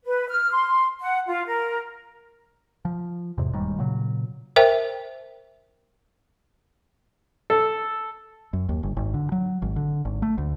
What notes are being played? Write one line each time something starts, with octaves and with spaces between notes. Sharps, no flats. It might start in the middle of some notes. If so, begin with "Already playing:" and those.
B4
F6
C6
F#5
F4
A#4
F3
E2 G#2 C3
E1 D#2 G#2 G3
A#2 C#3 F#3
A#4 C5 E5 G5
A4
F#2
D#2
G1
G#1
D3
F#3
G#1
D3
G#1
A3
D2